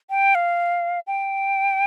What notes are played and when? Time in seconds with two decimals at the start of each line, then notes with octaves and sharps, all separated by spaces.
0.10 G5
0.35 F5
1.07 G5